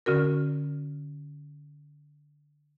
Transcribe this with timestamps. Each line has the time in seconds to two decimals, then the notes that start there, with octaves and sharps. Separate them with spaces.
0.06 D3 C#4 F#4 A#4